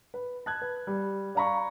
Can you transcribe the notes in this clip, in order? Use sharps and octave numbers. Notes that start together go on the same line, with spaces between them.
B4
A5 F#6 G#6
B4
G3
D5 F5 A#5 B5 C#6